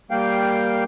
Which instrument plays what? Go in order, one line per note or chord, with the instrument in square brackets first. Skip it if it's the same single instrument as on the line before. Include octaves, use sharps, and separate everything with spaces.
[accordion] G3 A#3 F5 G5